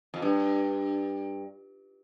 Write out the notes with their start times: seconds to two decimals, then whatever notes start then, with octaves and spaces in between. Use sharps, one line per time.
0.14 F2
0.22 G2